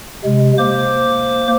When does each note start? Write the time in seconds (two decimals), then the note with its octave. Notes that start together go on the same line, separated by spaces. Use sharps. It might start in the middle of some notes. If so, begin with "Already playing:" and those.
0.24 C3 G#3
0.58 A#3 C5 D6